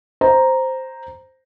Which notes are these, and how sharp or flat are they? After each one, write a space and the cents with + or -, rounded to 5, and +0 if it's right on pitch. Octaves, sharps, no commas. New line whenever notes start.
C5 +0 A#5 +0